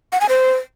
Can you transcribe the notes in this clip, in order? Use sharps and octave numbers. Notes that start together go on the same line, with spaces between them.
F#5
G#5
C5